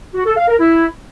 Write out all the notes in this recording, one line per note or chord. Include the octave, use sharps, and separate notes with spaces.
F#4
A4
F5
A#4
E4